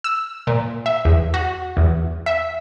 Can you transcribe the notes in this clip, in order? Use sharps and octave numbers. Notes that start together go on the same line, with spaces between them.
E6
A#2
E5
E2
F#4
E2
E5